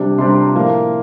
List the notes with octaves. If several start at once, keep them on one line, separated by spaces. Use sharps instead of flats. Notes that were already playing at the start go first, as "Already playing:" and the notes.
Already playing: C3 G3 D4
C3 G3 D4 C6
A#5
C6
A2 F3 A#3